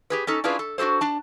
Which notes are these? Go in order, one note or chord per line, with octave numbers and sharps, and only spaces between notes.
G4 G#4 B4
C#4 D#4 A4
C#4 D4 E4 F4 G#4 B4
A4
D4 F#4 G4 A4 C5
D4 A5